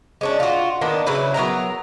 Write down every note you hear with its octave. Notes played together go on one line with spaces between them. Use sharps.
G#3 C#4 D4
F4 F#4
D#3 A#3 B3 D4
C#3 F#3 E4 B4
F#3 B3 A#4 A#5